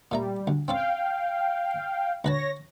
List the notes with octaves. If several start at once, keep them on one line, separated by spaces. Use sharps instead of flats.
A#2 G3 A3 A#5
D2
C4 C#4 A4 F5 G5
D2 B4 C#5 A5 A#6